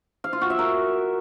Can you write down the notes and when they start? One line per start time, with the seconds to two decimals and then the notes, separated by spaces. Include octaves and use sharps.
0.24 F5
0.33 F4
0.41 F#4
0.50 E5
0.59 A#4